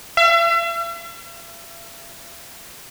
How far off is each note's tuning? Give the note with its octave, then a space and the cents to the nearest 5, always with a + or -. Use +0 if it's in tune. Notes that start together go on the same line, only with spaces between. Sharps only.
E5 +45